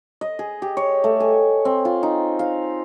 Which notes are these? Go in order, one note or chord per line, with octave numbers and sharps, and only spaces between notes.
D#5
G#4
G4
C#5
A3
G#5
C4
F4
D#4
F5